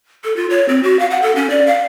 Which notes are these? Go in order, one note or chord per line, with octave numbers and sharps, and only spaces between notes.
A4
F4
C#5
C4
F#4
F5
F#5
A4
C#4
D5
F5